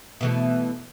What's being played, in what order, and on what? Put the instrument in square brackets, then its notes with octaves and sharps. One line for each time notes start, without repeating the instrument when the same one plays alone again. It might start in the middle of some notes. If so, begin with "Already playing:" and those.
[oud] B2 E3 A3